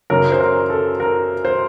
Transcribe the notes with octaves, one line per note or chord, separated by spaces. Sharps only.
F#2 C#3 F#3 A#4
C5
A#4
A4
A#4
C5